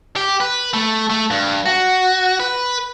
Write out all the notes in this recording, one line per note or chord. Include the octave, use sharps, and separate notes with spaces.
G4
B4
A3
A3
G2
F#4
B4